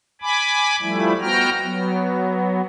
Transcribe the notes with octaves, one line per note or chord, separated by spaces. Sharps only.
G#5 B5 D6
F3 G3 A3 E4
B3 F#4 G5 A#5 F6
F#3 B3